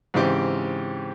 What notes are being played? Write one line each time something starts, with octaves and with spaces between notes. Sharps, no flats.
G#2 C#3 E3 C4 G4 D6